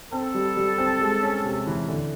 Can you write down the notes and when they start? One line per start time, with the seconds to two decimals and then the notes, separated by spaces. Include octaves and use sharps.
0.13 C4 A4
0.35 G3
0.57 G3
0.78 C4
1.01 G#3
1.22 C#4
1.44 C3
1.67 E3
1.88 D3